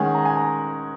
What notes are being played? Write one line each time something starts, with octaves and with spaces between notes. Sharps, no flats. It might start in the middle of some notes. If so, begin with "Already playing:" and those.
Already playing: D#3 G#3 C#4 F#5 G#5
A#5
G#5
A#5